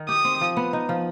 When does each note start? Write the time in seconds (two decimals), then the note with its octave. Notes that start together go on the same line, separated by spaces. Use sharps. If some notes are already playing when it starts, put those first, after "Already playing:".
Already playing: D#3
0.09 G4 D#6
0.25 C4
0.41 F3
0.57 B3
0.73 D#4
0.89 F3